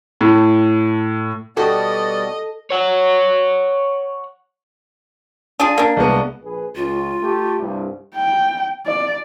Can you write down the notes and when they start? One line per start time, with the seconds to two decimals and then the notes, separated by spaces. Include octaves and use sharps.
0.21 A2
1.57 B2 G3 B3 F#4 G4 A4 D5 D#5
2.71 C#5 F#5
5.60 D4 F4 G#4
5.78 A#3 D4
5.97 C2 G#3 B3
6.44 A#1 G#4 B4
6.76 C#2 F4
7.22 A3 G4
7.60 C2 G2
8.15 G5
8.86 D5